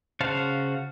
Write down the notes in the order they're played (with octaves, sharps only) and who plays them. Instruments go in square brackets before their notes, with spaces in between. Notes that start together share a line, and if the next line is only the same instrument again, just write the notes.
[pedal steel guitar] C#3 F#4 C5 F5 A5